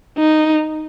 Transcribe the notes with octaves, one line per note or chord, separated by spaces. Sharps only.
D#4